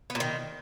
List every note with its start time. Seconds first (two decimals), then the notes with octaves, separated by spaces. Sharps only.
0.10 B3
0.15 A#2
0.20 D#3